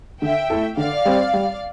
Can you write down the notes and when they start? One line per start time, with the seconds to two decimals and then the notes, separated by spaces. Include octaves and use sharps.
0.22 D3 E5 G5
0.50 A3 E4 A4
0.77 D3 D5 F5
1.05 G3 C4
1.34 G3